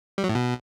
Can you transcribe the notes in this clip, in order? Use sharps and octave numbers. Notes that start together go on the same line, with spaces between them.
G3
F#3
A2
B2